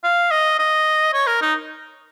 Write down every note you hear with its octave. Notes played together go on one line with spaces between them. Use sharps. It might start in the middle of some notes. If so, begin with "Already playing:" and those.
F5
D#5
D#5
C#5
A#4
D#4